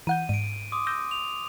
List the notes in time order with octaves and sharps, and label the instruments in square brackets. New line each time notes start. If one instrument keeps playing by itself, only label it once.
[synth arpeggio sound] E3 F#5 G6 [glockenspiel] D#7
[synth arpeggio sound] G#2 [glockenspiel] D7 D#7
[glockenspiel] C6 D6 D#6
[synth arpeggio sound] E6 G6 A#6
[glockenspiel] F7